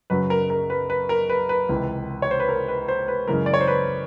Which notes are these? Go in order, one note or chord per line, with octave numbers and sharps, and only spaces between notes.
F#2 C#3 F#3 B4
A#4
A#4
B4
B4
A#4
B4
B4
C#2 C3 E3
C#5
C5
B4
A#4
B4
C5
B4
F#2 C#3 E3 G#3 A#4
D5
C#5
C5
B4